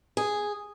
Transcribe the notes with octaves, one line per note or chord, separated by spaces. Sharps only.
G#4